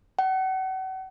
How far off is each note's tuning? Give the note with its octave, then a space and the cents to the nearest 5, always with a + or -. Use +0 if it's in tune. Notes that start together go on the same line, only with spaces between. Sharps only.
F#5 +40